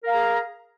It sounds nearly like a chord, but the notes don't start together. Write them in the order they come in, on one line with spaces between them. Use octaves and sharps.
A#4 F5 A#5 G#4